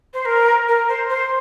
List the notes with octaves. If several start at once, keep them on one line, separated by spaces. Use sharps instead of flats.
C5
A#4
A#4
C5
C5